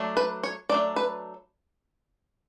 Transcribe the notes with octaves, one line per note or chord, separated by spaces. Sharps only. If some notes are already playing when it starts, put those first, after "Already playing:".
Already playing: F#3 A3 D4
B4
C#5
F#3 A3 D4 D5
B4